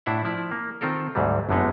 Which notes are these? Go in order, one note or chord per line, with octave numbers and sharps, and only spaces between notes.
A2 D4 E4 E5 F#5
F3 E4 D5
A#3
D#3 C4 F4 A4 A#4
D2 G#2 F#3 G3
G1 F#2 D3 G#3 B3 D#4